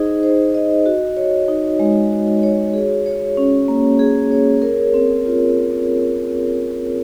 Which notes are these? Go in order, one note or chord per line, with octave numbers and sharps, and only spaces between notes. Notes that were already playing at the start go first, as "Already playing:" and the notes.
Already playing: D#4 G#4 C5 D#5
C5
D#5
F#4
C#5
D#4
G#3
F#4
C#5
G#4
C#5
C#4
A#3
G#4
C#5
A#4
C4
F4